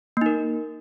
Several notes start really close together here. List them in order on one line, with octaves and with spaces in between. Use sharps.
A#3 D#4 A#4